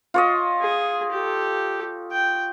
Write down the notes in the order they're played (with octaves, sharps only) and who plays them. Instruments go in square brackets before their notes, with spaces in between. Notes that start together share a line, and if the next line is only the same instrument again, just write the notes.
[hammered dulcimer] F4 C#5 D#5
[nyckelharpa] G#4
G4 A4
G5